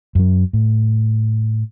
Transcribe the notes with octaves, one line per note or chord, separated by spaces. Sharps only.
F#2 F#3
A2